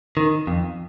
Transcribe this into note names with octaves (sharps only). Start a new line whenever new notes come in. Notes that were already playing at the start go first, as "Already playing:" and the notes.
D#3
F2